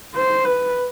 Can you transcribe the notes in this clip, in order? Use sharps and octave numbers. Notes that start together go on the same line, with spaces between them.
C5
B4